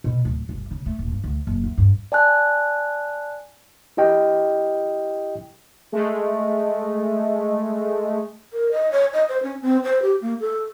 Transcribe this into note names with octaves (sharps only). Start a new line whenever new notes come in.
B2
D1
G1
C#3
A3
D#1
G2
D2
F#1
E2
G2
D5 G#5 A5 F#6
E4 G4 D#5 G5
G#3 A3
A#4
D#5
C#5
D#5
C5
C#4
C4
C5
G4
A#3
A4